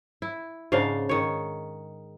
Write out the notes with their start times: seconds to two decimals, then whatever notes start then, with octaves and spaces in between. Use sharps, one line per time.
0.22 E4
0.72 G#2 C#3 D4 F5
1.09 D#3 C#5